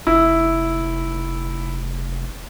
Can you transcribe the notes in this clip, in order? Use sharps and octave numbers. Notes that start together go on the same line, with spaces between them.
F1 E4